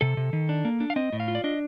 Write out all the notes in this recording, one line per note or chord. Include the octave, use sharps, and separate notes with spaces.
C3 A4
C3
D#3
D4
A#3
D4
F5
C4 D#5
A2
F5
F4
D5
D4 D#5